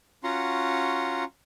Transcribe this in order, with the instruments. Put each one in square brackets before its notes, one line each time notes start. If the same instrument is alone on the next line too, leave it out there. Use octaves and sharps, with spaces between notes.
[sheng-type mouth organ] C#4 F4 F#4 F#5 A#5 C6